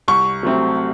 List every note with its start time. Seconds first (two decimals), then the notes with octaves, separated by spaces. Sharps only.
0.08 C2 C#6
0.43 C3 F#3 A3 C4